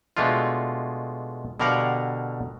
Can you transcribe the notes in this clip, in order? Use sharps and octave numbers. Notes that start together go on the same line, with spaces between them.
B2 G#3 A3 D4 F4
B2 D3 G3 A#4 F5 F#5